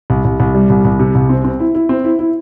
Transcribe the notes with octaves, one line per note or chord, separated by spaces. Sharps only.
C2
C2
C2
G3
C2
C2
C3
C2
C4
C4
E4
E4
C4
E4
E4